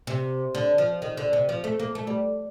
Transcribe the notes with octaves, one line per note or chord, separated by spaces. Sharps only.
C3
D3
F3
D#3
D3
C3
F3
A3
A#3
A3
G3